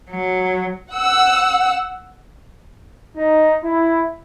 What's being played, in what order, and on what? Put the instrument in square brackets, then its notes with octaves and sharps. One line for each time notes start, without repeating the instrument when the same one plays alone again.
[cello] F#3
[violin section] F#5 E6
[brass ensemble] D#4
E4